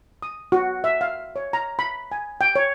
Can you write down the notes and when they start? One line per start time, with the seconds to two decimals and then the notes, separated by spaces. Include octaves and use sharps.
0.22 D#6
0.52 F#4
0.84 E5
1.01 F5
1.36 C#5
1.53 A#5
1.79 B5
2.12 G#5
2.41 G5
2.56 C#5